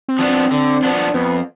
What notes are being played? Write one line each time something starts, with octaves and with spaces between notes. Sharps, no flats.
C4
F3 B3 D4
C4
D3
F3 B3 D4
F2 B3